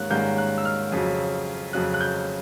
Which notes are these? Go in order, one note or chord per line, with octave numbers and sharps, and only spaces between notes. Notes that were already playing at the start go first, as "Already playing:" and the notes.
Already playing: G#2 D#3 G3 A#3 C#4 F#6
G#2 D#3 G3 A#3 C#4 G6
F#6
E6
F6
F2 C#3 F#3
F2 C#3 F#3 F#6
F#6
G6